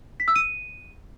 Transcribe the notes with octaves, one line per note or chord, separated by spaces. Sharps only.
B6
E6
D#7